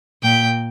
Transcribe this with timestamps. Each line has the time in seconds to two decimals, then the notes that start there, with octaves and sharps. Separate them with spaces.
0.23 A#2 G5